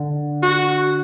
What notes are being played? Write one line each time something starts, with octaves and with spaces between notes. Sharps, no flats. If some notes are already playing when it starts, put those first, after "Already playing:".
Already playing: D3
F#4